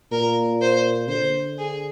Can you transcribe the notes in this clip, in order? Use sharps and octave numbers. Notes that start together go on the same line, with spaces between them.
A#2 A#4
C5
D3 C5
G#4